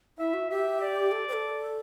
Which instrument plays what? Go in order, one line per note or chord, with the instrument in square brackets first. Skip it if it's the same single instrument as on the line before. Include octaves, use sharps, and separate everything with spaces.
[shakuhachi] E4 [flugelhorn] E5
[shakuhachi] F#4
[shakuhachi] G4 [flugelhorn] E5
[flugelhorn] D5
[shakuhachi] A4
C5
A4